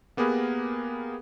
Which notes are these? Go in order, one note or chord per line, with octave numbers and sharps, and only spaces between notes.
A#3 B3 G4 G#4 A#4 B4